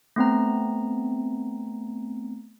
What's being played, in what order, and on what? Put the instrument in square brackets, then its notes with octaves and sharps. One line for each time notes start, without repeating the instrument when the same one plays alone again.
[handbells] A3 B3 C4 A#5